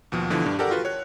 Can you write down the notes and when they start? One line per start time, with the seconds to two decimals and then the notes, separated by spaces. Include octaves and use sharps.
0.12 D#2 B2 F3
0.30 B2 D3 E3 F3
0.45 G2 D4 G4
0.59 G4 A4 A#4 D5 F#5
0.71 F4 F#4 B4
0.85 C#5 F#6